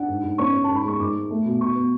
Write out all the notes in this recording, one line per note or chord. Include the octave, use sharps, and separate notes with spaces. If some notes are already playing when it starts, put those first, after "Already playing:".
Already playing: D4 F#5
G#2
G#2
C#4 C#6
C#4
G#2 A5
B5
G#3 C#6
G#2 D6
G#3
A3
B2
B2 C#6
B3